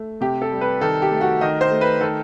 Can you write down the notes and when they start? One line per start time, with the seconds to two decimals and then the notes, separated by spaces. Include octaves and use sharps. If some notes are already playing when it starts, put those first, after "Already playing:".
Already playing: A3
0.21 C3 G4
0.42 A4
0.51 G3
0.61 B4
0.81 D#3 A4
1.02 G4
1.11 A3
1.21 F#4
1.41 D#3 D#5
1.61 C5
1.71 A3
1.81 B4
2.01 D#3 A4